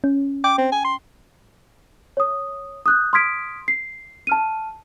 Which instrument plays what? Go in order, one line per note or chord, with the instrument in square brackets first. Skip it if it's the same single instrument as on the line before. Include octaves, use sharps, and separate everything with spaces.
[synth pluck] C#4
[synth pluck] G5 [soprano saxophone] D6
[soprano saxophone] C4
G#5
C6
[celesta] C#5 D#6
D#6 F#6 G6
C6 D#6 F6 G#6 B6 D7
C7
A5 F6 D#7